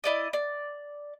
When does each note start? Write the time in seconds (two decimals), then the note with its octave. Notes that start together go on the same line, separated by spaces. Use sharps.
0.04 E4 D5 D#5
0.33 D5